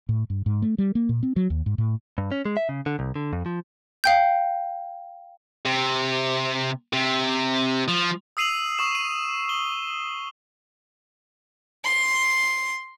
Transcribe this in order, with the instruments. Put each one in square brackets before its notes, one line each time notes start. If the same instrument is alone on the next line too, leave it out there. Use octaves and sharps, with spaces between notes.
[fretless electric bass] A2
G2
G#2
A3
G3
A#3
A#2
C4
F#3
D#2
G#2
A2
[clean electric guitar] G2
C#4
G#3
E5
C#3
D3
C2
D3
F2
F3
[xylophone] F5 G5 G6
[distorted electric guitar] C3
C3
F3
[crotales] D#6 E6 C7 D#7 F7 F#7
C#6 D#6 E7
D#7
G7
[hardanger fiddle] C6